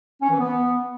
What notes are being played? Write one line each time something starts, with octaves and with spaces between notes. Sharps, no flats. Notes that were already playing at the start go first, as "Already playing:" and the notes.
C#4
E3
B3